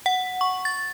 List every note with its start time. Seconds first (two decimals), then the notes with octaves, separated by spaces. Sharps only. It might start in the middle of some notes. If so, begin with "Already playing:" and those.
0.06 F#5
0.41 C#6
0.65 A6